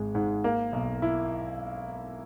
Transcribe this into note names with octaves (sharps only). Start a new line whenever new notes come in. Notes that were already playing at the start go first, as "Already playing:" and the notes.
Already playing: G#1 G#3
G#2
A#3
B1
E4